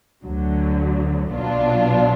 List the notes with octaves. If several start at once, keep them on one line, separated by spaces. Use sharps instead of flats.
D2 D3 F#3
B1 B2 F#3 D4 F4